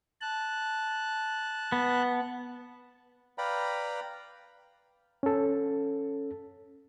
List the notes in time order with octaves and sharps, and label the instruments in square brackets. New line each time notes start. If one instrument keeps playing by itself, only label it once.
[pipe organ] A5 F#6
[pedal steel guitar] B3
[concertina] B4 D5 F5 G5 A#5 B5
[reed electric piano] C#4 A4